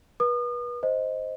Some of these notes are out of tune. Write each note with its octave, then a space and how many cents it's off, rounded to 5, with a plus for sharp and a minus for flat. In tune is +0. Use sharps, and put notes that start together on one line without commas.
B4 -35 D#6 -40
C5 +0 D#5 +0